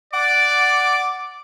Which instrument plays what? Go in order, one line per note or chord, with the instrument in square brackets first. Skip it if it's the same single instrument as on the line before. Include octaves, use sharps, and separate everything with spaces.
[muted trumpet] D5 [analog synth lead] F#5 [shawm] D6